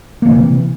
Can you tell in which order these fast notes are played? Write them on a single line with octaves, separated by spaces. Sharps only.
A#3 F3 E3 C3